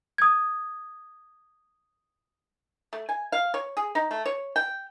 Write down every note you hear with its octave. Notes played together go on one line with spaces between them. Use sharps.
D#6 G#6
A3
G#5
F5
C#5
G#4
D#4
A3
C#5
G5